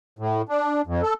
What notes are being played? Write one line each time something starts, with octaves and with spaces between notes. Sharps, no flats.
A2
D4
F2
A4